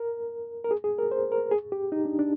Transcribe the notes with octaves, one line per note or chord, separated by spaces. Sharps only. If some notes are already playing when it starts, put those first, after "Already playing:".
Already playing: A#4
A#4
G#4
G#4
A#4
C5
A#4
G#4
G4
D#4
D4
D4